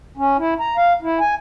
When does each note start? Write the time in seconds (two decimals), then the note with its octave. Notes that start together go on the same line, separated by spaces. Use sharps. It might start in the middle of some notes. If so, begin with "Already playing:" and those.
0.17 C#4
0.38 E4
0.60 A#5
0.77 F5
1.02 E4
1.20 G#5